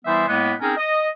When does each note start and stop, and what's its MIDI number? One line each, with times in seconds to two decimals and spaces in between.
0.05 0.24 52
0.05 0.24 55
0.05 0.24 59
0.05 0.24 64
0.05 0.24 72
0.05 0.24 76
0.28 0.54 45
0.28 0.54 56
0.28 0.54 58
0.28 0.54 59
0.61 0.74 60
0.61 0.74 61
0.61 0.74 63
0.61 0.74 68
0.61 0.74 70
0.77 1.07 75